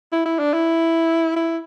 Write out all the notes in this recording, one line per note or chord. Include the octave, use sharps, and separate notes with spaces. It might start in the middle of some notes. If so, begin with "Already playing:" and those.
E4
E4
D4
E4
E4